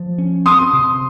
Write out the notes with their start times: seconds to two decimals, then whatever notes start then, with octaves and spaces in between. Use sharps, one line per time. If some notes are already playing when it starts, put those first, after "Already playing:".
Already playing: F3
0.18 C#4
0.46 C4 C6 D#6
0.73 C3